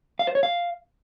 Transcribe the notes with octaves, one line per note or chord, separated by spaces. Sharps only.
F5
C5
C#5
F5